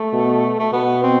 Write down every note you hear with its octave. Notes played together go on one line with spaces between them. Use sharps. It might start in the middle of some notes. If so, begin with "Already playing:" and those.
Already playing: A3
B2
A3
B2 B3
C4